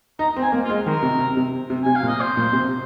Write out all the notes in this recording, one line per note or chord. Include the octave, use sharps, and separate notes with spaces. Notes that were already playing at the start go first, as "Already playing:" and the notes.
D#4 A#5
C4
G#5
A#3
F4
G#3
D#3 A#4
C3
C3
C3
C3
C3 G#5
F5
A#2
D#5
C5
A#2
C3